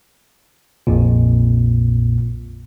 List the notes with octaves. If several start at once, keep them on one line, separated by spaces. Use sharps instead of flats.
A#1 F2 A#2